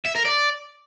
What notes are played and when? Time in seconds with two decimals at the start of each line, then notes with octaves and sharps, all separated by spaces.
0.05 E5
0.15 A#4
0.25 D5